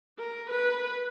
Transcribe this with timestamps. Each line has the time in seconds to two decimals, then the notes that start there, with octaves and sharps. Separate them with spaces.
0.18 A#4
0.50 B4